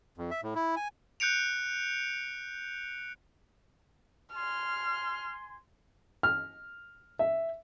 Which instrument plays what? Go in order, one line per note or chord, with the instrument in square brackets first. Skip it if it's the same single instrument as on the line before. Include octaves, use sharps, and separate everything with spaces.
[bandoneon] F2
E5
A2
E4
G#5
[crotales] F#6 G6 C#7 D7 F7
[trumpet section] G#5 C6 [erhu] F6
[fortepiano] F6
E5